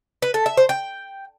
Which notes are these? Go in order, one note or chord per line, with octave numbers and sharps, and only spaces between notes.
B4
A4
E5
C5
G5